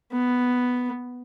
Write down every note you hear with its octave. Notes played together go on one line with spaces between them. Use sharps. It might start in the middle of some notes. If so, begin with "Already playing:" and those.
B3